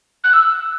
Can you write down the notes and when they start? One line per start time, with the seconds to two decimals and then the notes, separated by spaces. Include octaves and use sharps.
0.23 F#6
0.33 E6